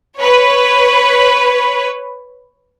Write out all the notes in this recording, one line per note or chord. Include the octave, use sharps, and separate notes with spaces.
B4 C#5